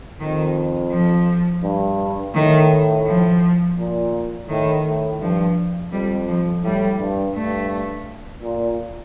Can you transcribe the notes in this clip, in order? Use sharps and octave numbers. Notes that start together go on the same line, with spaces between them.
F2 D#3
F3
G2
A2 D#3
F3
A#2
A2 D#3
A2
G2 F3
F2 G3
F3
A2 G3
G2
G2 A3
A#2